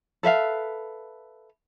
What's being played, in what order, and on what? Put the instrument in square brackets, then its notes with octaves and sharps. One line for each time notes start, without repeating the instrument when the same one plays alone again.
[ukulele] A4 B4 E5 F5